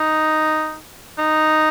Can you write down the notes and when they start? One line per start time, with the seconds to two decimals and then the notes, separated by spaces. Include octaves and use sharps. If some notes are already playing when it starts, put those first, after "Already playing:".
Already playing: D#4
1.18 D#4